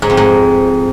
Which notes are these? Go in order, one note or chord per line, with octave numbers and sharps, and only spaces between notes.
G#2
F2
G#2